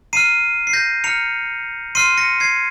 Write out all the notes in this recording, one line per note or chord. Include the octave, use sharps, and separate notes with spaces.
A#5 F6 C7 D#7
C7
G6 A#6
A#5 F6 C#7 F7
C6 F6 C7 D#7
A#6 C#7
G#6 C7